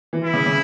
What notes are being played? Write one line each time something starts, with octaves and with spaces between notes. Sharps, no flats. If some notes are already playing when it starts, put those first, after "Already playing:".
E3
E4
C#3
C#3